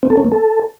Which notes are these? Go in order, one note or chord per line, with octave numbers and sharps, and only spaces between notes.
C4
A4
C#4
A#3
A4